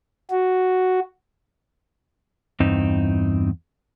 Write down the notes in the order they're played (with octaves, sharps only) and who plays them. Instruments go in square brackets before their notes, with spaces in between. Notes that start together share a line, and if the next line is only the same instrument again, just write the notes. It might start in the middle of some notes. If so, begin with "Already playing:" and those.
[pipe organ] F#4
[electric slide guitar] E2 G2 C4 D#4